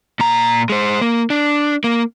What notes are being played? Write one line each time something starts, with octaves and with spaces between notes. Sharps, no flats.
A#2 A#5
G#3 C5
A#3
D4
A#3